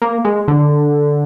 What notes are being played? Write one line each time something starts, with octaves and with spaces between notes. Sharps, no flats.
A#3
G#3
D3